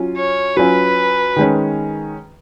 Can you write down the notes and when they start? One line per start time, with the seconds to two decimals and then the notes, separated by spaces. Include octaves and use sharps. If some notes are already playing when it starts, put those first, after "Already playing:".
Already playing: F#3 C#4 F4
0.17 C#5
0.56 F#3 C#4 F4 B4
1.36 D#3 G#3 C#4